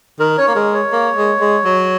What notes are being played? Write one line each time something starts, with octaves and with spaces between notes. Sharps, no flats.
D#3 A#4
C#4 C#5
A#3
G#3 A#4
C#5
A#3
G#3
G#3
F#3